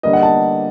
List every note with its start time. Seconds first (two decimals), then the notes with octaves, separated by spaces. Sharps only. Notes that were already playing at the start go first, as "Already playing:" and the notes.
0.03 D3 G3 A#3 D#5
0.13 F#5
0.23 A5